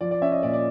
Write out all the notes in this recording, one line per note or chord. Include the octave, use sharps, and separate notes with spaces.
F3 D5
D5
C#4 E5
D#5
A#2 D5
D5